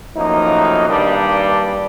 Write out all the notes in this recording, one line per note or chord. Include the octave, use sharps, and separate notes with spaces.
F#2 A2 F3 A#3 D#4
G2 A#2 D#3 G3 D4